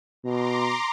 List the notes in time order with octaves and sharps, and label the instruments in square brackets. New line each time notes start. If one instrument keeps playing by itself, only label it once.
[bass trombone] B2 [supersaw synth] A#5 C6 D6